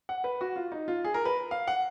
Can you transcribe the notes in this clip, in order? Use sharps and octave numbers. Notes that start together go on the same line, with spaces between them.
F#5
B4
F#4
F4
D#4
F4
G#4
A#4
B4
F5
F#5